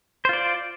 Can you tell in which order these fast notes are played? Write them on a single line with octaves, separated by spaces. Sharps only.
C5 F4 D5